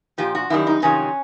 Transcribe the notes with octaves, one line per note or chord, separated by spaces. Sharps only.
A#2 F3 G4
F#4
F#2 D#3 G3 E4
D#4
F2 C3 D#3 F#3 C#4